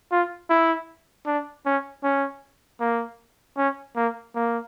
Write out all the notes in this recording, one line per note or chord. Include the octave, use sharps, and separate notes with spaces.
F4
E4
D4
C#4
C#4
A#3
C#4
A#3
A#3